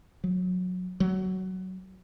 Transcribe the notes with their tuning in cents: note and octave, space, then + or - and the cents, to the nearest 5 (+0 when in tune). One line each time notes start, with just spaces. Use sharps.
F#3 -20
F#3 +15